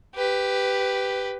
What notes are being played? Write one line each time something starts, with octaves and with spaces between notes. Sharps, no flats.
G4 B4